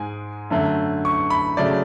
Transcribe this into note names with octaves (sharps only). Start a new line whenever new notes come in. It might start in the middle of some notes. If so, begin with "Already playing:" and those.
Already playing: G#2 G#3 G#5
F#2 D3 A3
C#6
B5
C#3 F#3 A3 D5